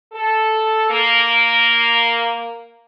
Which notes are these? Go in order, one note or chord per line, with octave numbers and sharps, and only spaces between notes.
A4
A#3